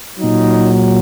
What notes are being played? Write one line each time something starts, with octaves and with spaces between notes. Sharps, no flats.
A#2 F#3 D#4